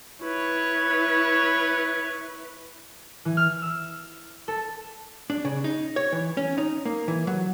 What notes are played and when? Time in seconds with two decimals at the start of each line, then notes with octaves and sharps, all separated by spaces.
0.21 E4 B4 C#5
3.25 E3
3.37 F6
3.62 E6
4.48 A4
5.30 D4
5.45 C#3
5.64 D#4
5.96 C#5
6.12 E3
6.37 C#4
6.58 D#4
6.85 A#3
7.08 E3
7.27 F#3